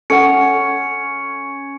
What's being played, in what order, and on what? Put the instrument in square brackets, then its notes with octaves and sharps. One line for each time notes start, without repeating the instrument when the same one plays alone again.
[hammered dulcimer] C#4 [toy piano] A4 F#5 [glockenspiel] C#7